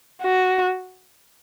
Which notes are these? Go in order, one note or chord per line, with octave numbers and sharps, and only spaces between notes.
F#4